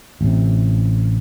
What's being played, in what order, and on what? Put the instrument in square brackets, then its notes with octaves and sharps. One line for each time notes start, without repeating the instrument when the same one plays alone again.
[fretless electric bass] A1 C3